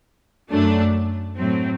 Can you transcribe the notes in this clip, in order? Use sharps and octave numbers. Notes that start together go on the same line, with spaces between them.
F#2 F#3 A3 D4
A2 F#3 C4